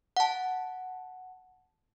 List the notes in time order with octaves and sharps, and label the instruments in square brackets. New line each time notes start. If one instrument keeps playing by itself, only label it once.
[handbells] F#5 A5